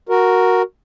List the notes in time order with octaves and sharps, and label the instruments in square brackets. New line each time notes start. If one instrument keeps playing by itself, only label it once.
[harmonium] F#4 A#4